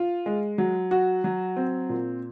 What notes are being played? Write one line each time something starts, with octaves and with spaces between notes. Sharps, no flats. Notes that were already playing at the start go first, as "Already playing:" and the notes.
Already playing: F4
G#3
F#3
F#4
F#3
C4
A#2